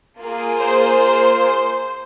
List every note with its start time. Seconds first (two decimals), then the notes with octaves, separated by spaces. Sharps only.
0.20 A#3 F4 G#4
0.59 C5